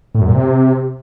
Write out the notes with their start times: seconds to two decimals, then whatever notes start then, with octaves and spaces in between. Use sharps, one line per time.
0.15 A2
0.21 F#2
0.28 A#2
0.34 C3